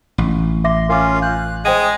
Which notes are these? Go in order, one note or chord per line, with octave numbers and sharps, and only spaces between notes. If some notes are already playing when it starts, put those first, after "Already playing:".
A1
E5 C6 D6 A#6
C#4 F4 A#4 F5 D6
F#6 G6
G#3 C5 G5 D#6 D#7